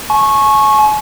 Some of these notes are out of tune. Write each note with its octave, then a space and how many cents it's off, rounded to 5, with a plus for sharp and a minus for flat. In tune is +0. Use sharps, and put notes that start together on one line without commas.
G#5 +40 C#6 -15